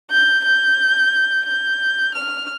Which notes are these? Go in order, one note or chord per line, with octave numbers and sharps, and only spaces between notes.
G6
G6
G6
F6